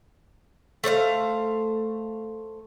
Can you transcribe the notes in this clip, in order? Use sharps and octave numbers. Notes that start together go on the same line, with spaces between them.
A3 C5 C#5 F5